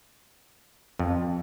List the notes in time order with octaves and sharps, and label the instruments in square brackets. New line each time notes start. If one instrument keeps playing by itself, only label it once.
[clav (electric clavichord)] F2